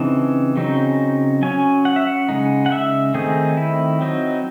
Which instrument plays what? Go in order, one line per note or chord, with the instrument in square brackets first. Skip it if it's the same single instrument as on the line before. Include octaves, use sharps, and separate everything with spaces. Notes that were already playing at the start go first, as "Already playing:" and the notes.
Already playing: [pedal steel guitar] C#3 E3 C4 D#4 A5
C#3 F#3 C4 D#4
F#3 C#4 G#5
F#5
E5
F#5
C#3 G#3 D#4
F#5
E5
D#3 A3 C4 D#4 G#4
E4
F#3 C4 D#4